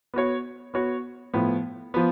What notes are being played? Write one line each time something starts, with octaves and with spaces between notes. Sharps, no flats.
B3 F#4 C#5
B3 F#4 C#5
A2 F3 B3
F3 B3